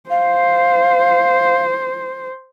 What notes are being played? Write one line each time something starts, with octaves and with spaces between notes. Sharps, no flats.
C5 F5